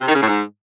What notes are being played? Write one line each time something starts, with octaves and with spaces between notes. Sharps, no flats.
C3
D#3
C#3
A2
G#2